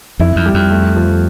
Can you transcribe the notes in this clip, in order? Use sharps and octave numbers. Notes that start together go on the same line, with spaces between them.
F2 E4
F2
G3
F2
A3
F3